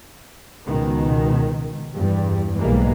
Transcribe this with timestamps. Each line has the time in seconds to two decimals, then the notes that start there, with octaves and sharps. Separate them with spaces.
0.68 C#2 B2 D#3
1.97 E2 G2 G3
2.59 B1 G#2 E3 G3 G#3 A#3